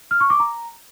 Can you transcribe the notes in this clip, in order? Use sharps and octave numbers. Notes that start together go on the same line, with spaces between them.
F6
C#6
D6
A#5